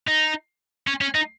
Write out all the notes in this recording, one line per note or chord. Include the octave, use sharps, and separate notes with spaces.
D#4
C#4
C#4
D#4